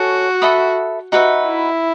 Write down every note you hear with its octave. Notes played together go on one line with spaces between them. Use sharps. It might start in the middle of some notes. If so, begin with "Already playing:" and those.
Already playing: F#4 A4 C#5 G#5
A4 E5 B5 D#6
D#4 F#4 B4 E5
E4